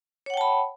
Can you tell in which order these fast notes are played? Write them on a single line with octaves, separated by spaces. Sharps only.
C#5 F#5 G5 A5 B5